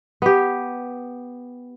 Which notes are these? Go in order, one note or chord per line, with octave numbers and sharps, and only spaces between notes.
B3 G4